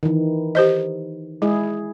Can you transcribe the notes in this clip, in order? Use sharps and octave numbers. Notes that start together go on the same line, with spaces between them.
D#3 E3
G4 C5 D#5
G#3 E4 G#4